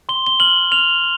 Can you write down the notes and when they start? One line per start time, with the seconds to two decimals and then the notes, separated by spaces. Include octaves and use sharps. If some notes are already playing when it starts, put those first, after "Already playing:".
0.09 C6 G7
0.27 G7
0.40 F6 F#7
0.72 F6 F7